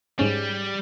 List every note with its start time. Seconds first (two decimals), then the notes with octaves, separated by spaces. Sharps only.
0.19 G#2 G3 C#4